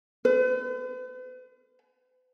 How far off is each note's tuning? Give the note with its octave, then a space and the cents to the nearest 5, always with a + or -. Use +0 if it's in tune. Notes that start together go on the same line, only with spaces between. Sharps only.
B4 +45